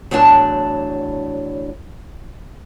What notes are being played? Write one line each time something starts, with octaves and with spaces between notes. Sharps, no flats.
E2 A2 F#3 D4 A5